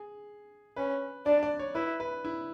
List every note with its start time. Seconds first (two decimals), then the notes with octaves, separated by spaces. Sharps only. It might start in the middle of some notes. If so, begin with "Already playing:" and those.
Already playing: G#4
0.76 C#4 B4
1.26 D4 D5
1.43 D5
1.59 C#5
1.75 E4 B4
2.00 B4
2.25 E4